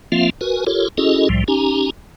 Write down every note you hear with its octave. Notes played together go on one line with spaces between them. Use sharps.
F3 A#3 C4 F4 E5 F5
F#4 A#4 B4 G#5
F4 G4 A4 A#4 C#5
C#4 E4 F#4 G#4 A4 D#5
C2 A2 F3 G3
C#4 D#4 G4 G#5 A#5